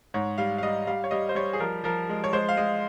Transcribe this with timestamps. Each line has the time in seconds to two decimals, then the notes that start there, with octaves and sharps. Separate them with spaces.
0.14 G#2 C#5
0.38 G3 F5
0.58 F5
0.63 G3 D#5
0.87 G3 F5
1.04 C#5
1.11 G3 D#5
1.29 C5
1.35 G3 C#5
1.53 G#4
1.60 F3 A#4
1.84 F3 A#4
2.09 G#3
2.24 C#5
2.33 G#3 C5
2.49 F5
2.57 G#3 D#5